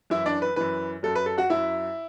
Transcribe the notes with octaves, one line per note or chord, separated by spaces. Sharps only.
F#2 E3 E4 E5
D4 D5
B4
F#2 E3 B4
F#2 F#3 A4
B4
A4
F#4 F#5
F#2 F#3 E4 E5